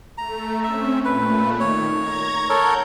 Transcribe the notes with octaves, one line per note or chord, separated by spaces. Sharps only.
A3 A#5
C4 C#4 E5
A#2 A3 B4
D#3 C#5
A#5 G#6
A4 A#4 C#5 F#5 G6